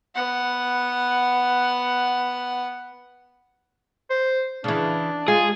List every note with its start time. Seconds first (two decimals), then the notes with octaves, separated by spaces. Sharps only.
0.14 B3 F#5
4.10 C5
4.64 C#3 E3 D4
5.28 G#3 F4 G#4